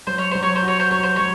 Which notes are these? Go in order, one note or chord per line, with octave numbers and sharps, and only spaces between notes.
F#3 C5
C#5
F#3 C5
C#5
C5
F#4
C#5
C5
F#3 C#5
C5
F#3 C#5